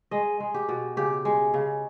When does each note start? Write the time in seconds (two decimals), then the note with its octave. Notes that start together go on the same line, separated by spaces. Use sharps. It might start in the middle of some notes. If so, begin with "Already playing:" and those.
0.11 G#3 D#5
0.40 G#3
0.54 G4
0.69 B2
0.97 C#3 G4
1.25 G#3
1.54 C#3